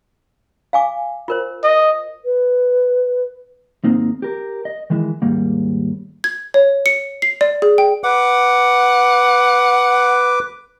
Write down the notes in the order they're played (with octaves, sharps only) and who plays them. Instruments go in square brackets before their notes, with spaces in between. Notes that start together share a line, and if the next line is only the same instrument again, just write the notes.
[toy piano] F5 G#5 D6
F4 A#4 C5
[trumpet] D#5
[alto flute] B4
[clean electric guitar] D#2 G#2 A#3 C4 D#4
G4 A#4
D#5
D#3 E3 G#3 E4
D#2 G#2 G3 A#3
[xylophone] G#6
C#5
C#7
C7
D5
G#4
G5
[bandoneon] B4 D6 [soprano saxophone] F#5